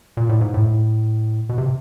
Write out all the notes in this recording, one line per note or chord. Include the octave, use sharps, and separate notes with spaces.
A#2
A2
G#2
A2
B2
C3